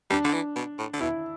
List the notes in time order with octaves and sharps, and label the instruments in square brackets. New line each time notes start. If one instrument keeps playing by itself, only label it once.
[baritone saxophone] G3 [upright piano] D4
[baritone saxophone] D3
E3
B2
A2
D3
[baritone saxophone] B2 [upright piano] E4